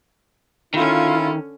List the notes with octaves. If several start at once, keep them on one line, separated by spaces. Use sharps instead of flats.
D3 D#3 C#4 E4 F4